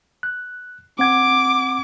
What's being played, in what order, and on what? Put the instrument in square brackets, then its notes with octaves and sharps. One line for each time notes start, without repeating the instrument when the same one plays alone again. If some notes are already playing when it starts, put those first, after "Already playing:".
[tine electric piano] F#6
[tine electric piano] C4 F#5 G#6 [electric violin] D6